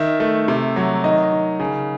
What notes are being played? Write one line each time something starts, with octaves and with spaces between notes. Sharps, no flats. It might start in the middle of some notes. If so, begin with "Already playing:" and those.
Already playing: D#3 E5
A3
C3
F#3
D#3 D#5
D#3
C#3